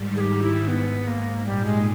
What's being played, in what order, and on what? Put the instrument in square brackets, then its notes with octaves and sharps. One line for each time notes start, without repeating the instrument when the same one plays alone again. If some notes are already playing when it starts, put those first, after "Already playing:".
Already playing: [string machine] G#2 D#3 G3
[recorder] G#4
G4
E4
B3
A#3
[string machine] A#2 [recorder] G3
[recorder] G#3